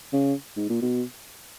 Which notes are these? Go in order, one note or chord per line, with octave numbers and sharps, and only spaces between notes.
C#3
G#2
A#2
B2